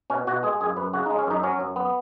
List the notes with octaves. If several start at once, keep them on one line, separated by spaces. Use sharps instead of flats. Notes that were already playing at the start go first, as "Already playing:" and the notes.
B2 C#4
B2 F#4
G#3 G#4
F#2 G#4
F#2 B4
C#3 F#4
D#4
G#3
C#4
F#2 D#4
F#3 C#4
F#2
B3